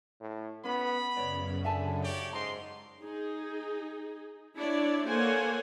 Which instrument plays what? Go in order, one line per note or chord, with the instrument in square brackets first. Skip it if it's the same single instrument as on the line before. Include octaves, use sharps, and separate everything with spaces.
[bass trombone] A2
[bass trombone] B3 [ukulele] C#4 [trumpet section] B5
[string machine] F#2 C#3 [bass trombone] B3 [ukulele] C#5 D5
[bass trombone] D3 [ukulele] E5 G#5 A5
[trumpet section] G4 C#5 D5
[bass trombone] G#2 [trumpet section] D#5 C6 [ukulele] A#5
[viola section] D#4 G#4
D4 E4 C#5 D5
A#3 A4 C5 C#5 F#5 G#5